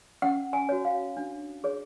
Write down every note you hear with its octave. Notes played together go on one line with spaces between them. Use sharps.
C#4 F#5
G#5
F#4 C#5
F5
D4
G#4 C#5